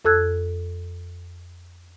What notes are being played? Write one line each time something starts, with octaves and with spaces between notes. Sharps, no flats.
F2 A4 A5 E6 F#6 G#6